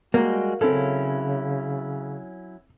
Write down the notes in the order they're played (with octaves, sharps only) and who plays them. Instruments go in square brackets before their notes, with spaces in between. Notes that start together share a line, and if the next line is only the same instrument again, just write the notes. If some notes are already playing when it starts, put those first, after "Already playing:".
[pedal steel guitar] G3 G#3 [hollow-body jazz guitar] A#3 [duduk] F#4
[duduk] C#3 [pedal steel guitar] F#3 C#4 E4 [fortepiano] C4 A4